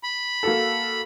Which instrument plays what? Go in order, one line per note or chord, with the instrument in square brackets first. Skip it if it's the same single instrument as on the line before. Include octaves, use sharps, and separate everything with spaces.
[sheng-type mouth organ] B5
[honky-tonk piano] A#3 F#4 A4